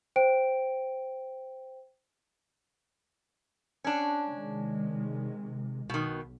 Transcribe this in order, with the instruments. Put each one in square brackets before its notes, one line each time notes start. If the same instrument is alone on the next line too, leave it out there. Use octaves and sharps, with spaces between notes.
[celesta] C5 G5 D7
[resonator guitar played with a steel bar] C#4 D4
[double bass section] C3 D#3 G#3
[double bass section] B1 [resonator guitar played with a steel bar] B2 D#3